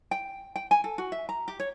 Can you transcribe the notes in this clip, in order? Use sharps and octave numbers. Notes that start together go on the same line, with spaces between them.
G5
G5
G#5
A4
F#4
E5
A#5
G4
C#5